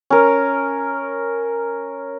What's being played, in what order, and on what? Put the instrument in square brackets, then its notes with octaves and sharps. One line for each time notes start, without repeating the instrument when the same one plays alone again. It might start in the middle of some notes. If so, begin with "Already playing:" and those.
[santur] C#4 A#4